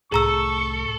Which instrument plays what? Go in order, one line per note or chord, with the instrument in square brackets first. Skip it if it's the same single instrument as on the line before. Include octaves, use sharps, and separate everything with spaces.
[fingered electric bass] C2 A2 [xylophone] G#4 A#5 E6 [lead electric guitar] A4 [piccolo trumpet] C#6